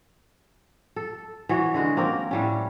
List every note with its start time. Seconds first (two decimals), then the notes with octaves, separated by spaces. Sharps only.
0.96 A4
1.49 E3 B3 F#4 C#5
1.74 D3 G#3 F#4
1.97 A#3 C4 C#4 A#4
2.31 A2 G3 C#4